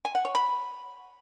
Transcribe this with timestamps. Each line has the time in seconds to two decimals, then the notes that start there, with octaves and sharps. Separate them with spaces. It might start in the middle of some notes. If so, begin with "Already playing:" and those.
0.05 G#5
0.15 F#5
0.25 C#5
0.35 B5